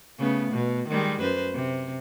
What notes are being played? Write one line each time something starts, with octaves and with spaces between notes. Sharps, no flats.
C#3 A3 B3
B2
D#3 G3 G#3
F#2 B4 C5
C3